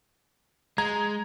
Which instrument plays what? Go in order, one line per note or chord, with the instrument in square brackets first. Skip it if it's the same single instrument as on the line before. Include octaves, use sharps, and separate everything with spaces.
[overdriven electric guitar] G#3 [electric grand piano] A#5 G#6